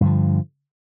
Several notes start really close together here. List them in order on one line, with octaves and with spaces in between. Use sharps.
G2 D3 F3